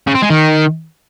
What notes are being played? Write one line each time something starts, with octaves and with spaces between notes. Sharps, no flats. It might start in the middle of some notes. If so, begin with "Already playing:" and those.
C#3
C4
G#3
D#3